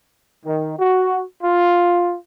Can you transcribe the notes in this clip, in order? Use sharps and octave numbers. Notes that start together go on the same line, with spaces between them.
D#3
F#4
F4